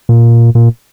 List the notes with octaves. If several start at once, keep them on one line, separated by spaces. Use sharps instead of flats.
A#2
A#2